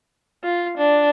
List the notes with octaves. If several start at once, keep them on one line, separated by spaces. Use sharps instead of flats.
F4
D4